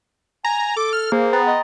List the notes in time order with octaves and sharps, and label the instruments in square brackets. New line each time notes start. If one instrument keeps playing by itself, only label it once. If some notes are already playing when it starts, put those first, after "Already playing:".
[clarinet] G#5 [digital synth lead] A#5
[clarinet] A4 [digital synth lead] D6
[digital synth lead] F6
[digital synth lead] A#3 [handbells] G#4 [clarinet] C5
[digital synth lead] B3 [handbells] G5 A#5 A6
[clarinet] D#5 [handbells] C6